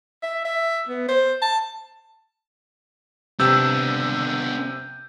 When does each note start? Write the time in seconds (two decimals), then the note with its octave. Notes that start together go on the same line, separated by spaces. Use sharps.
0.23 E5
0.45 E5
0.89 B3
1.08 C5
1.42 A5
3.40 C3 B3 D4 E6 G6